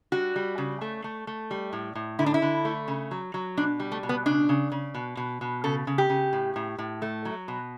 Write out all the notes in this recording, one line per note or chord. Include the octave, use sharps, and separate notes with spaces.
G3 F#4
G3
C#3
A3
A3
A3
G3
A2
A2
D3 E4
D4
E4
D3
A3
C#3
F#3
F#3
B2 D4
G3
A3
B2
B3
C#3 D4
C#3
C#3
B2
B2
B2
C#3 A4
C#3
G4
C#3
A2
A2
A2
A3
F#3
B2